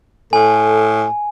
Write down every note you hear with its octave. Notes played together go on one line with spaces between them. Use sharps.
A2 A4 G#5